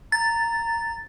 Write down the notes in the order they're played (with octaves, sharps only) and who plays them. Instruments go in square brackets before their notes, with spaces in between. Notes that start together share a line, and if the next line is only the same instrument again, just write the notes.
[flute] A#5 [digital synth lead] A6